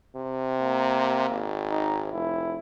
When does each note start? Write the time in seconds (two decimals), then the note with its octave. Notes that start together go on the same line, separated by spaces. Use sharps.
0.15 C3
0.61 A#3
1.30 G#1
1.71 D#4
2.13 F1 E4